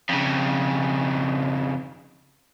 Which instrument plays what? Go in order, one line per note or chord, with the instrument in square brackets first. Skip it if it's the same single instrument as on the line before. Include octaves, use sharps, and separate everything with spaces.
[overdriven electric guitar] F2 C#3